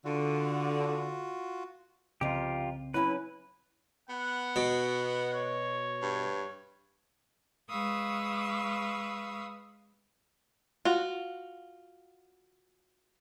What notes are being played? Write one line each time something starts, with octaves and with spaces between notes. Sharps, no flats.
D3 F4 F#4
C2 F2 C#3 C4 F4 G4 A#5
F#3 C#4 E4 B4
B3 F#5
B2
C#5
G2
G#3 B4 F5 C#6 D#6 E6
F4 F#4